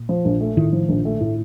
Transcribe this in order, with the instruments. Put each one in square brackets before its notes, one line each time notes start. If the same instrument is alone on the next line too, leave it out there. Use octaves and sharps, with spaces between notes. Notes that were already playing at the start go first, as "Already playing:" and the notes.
Already playing: [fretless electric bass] A#2
[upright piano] F3
A#1
A3
[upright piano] A2 [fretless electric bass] D#3
[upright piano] F3
A#1
A3
A2